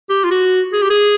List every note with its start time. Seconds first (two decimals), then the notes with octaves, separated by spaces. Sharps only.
0.10 G4
0.24 F4
0.31 F#4
0.73 G#4
0.82 G4
0.90 G#4